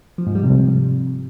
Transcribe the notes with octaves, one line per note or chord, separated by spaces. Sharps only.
F3
G#2
G3
C3